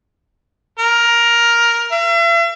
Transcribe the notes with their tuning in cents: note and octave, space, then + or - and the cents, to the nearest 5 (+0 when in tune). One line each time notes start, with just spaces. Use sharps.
A#4 +10
E5 +45